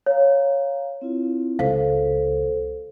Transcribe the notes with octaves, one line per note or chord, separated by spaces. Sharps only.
C#5 F5 A#5
C4 E4 F4
C#2 A4 C5 F5